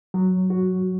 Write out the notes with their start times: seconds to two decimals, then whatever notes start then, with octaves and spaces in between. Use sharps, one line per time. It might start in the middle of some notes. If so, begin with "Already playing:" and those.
0.14 F#3
0.50 F#4